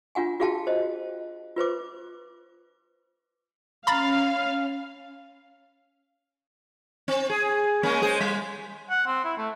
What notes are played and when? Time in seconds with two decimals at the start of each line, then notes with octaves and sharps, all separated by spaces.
0.15 D4 F4 F#5 G#5
0.40 F4 F#4 G#4 F5 G5 A5
0.67 C5 D#5
1.56 F4 B4 C5 D6
3.87 C#4 F5 A#5 B5 A6
7.08 C4
7.30 G#4
7.83 G#3 A#3 C#4
8.02 G#3 G#4 C5
8.20 G3
8.91 F#5
9.07 C4
9.25 E4
9.38 A3